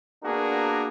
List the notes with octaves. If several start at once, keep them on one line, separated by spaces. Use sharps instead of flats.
A#3 B3 D4 F#4 G#4 A#4